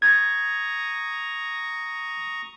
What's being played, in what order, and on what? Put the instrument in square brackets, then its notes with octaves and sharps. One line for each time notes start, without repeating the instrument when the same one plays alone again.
[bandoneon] A#5 C#6 D#6 [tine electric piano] G#6